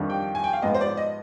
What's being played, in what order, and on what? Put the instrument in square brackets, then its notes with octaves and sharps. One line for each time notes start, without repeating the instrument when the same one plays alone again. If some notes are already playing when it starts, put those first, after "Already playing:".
Already playing: [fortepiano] F2 D#3 G3 D4
[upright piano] G5
G#5
G5
F5
[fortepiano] G#2 F3 B3 [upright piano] D#5
[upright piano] C5
D5
D#5